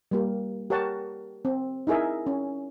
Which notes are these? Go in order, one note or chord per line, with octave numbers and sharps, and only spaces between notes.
G3 A#3 G4
G4 A#4 C#5 F#5 A5
C4
D#4 E4 G#4 A#4 E5
C#4